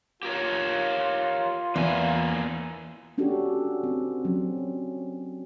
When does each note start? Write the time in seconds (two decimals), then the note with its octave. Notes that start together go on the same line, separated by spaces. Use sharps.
0.23 F4 G4 A#4 C#5
1.76 E2 A#3 E4 G#5
3.18 C#4 D4 F#4 G4 A4
3.84 C4
4.25 F#3 C#4